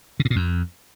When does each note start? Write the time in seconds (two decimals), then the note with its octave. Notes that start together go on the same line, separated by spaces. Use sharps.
0.20 C#3
0.25 A2
0.30 A#2
0.36 F2